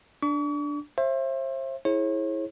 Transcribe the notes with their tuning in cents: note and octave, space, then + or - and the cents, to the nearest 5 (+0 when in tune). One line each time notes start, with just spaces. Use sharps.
D4 +0 C#6 +45
C5 +35 E5 +25
E4 -10 G#4 +20 C#5 -40